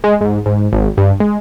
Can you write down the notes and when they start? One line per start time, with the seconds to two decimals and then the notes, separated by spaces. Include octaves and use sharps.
0.04 G#3
0.21 G#2
0.46 G#2
0.73 G#1
0.97 G2
1.20 G#3